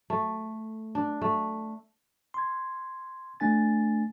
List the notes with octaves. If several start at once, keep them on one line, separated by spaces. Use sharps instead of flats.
A3
D4
A3
C6 G#6
A3 D4 G#5 A6